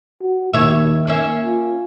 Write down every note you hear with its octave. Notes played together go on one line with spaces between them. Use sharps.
F#4
D#2 D#3 C#5 E5
A#3 C#4 E5
F4